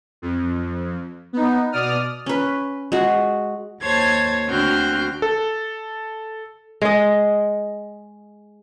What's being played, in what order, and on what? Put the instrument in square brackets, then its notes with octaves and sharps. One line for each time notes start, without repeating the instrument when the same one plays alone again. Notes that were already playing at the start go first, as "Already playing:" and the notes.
[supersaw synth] F2
B3 D#4
B2 D5 D#6 F6
[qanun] C#4 B4
G#3 F#4
[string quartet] D#2 C5 C#5 A5 G#6
D2 D3 C4 F#4 F6 G6
[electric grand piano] A4
[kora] G#3 D#5